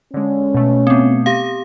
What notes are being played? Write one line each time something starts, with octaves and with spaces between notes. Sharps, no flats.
D3 G#3 C#4
B2 A3
B3 C4
G4 F5